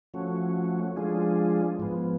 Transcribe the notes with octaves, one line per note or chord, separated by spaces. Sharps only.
F3 A3 C#4 F#4
F3 G#3 D4 F4 G#4
G#2 F3 B3